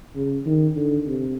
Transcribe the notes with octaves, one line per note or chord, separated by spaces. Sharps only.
C#3
D#3
D3
C3